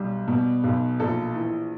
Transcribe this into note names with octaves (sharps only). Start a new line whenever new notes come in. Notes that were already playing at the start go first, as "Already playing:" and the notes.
Already playing: B1 G3
B2
B1
A#1 A4
E3